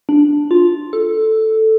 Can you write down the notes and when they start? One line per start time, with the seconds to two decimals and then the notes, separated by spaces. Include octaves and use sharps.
0.09 D4
0.51 F4
0.93 A4